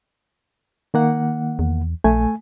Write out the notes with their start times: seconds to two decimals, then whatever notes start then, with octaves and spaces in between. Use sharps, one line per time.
0.94 D#3 A#3 F#5
1.59 E2
2.04 A#1 A3 G#5